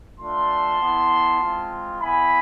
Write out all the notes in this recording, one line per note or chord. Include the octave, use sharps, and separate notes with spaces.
A3 D4 F4 A5 C6
B3 E4
G#3 C4 F4
B3 E4 G#5 B5